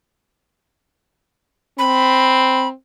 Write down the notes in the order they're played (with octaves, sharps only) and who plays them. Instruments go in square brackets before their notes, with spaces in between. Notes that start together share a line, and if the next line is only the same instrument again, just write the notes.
[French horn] C4 [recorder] B5